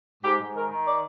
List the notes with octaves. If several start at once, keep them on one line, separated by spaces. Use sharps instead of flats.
G#2 G4
G#2
D#3 A#4
D#3
D5